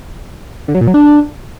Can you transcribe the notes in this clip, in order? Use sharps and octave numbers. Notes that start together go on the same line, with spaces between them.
D3
F#3
A#2
F#3
D4